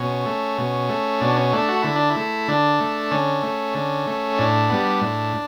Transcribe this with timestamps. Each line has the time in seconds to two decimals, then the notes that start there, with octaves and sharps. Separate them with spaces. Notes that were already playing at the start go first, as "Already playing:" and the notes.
Already playing: B2 C#4
0.26 A3
0.58 B2
0.89 A3
1.21 B2 D4
1.36 C#4
1.53 A3 D4
1.69 F#4
1.82 D3 E4
1.96 D4
2.10 E4
2.16 A3
2.48 D3 D4
2.80 A3
3.11 D3 C#4
3.43 A3
3.74 D3
4.07 A3
4.38 A2 D4
4.70 G3 B3
5.01 A2